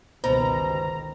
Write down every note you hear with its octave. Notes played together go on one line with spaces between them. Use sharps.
G1 C#2 B2 D#3 C5 A#5